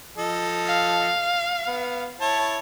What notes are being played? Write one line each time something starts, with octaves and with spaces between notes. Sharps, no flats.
F3 A4 D#5
F5
B3
E4 C#5 A5